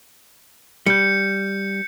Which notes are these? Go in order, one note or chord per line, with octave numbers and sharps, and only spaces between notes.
G3 G6 C#7